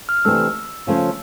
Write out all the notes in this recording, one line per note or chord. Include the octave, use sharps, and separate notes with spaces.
F6
C3 E3 A3 D4 E6
C#3 F3 A3 C#4